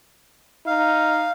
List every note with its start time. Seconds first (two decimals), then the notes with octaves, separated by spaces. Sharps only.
0.67 D#4 F5